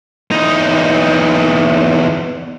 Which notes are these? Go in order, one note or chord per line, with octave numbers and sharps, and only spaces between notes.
E2 D#4